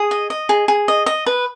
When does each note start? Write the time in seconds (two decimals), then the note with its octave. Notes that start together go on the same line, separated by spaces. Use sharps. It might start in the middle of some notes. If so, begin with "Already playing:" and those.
Already playing: G#4 D#6
0.11 D#5
0.30 D#5
0.49 G#4
0.68 G#4
0.88 D#5
1.06 D#5
1.26 B4